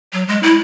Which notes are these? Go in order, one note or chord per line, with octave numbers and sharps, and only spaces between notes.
F#3
G#3
E4